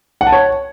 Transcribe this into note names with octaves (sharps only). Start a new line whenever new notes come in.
F#5
A5
C#5